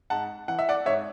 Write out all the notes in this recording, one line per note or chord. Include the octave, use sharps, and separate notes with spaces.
G#2 F#5 A5
E3 F#5
E5
D5 F#5
G#2 C#5 E5